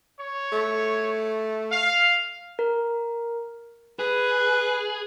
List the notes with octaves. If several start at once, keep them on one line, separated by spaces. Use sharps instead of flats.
C#5
A3
F5
A#4
G#4 B4